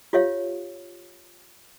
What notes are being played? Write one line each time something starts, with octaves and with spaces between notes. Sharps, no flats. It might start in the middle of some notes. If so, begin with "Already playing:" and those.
F4 G4 C#5 E5 F5